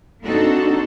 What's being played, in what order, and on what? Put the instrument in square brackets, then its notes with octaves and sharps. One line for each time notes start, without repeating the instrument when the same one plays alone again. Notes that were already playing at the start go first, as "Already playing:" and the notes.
[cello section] A#3 C4 D4 D#4 F#4 A4